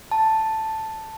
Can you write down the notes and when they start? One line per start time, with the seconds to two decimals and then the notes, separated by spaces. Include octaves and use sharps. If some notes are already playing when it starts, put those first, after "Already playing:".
0.11 A5